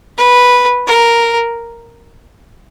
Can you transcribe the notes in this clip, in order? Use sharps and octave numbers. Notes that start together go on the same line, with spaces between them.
B4
A#4